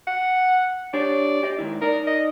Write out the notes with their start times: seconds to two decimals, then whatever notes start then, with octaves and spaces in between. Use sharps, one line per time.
0.07 F#5
0.94 D4 G4 C#5 D5
1.43 G4 D#5
1.59 G#2 D#3 E4
1.82 D#4 A#4 D5
2.07 D#5